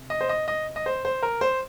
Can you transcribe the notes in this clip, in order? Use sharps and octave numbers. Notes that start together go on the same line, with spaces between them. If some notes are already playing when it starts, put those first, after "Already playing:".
Already playing: C3
D#5
C5
D#5
D#5
D#5
C5
C5
A#4
C5